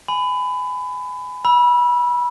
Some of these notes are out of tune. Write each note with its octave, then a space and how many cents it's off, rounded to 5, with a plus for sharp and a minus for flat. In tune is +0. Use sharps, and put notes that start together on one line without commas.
G#5 +10 B5 +25
B5 -25 E6 +5